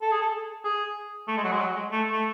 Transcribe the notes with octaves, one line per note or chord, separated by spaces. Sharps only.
A4
G#4
A4
G#4
A3
G#3
F#3
G#3
F#3
G#3
A3
A3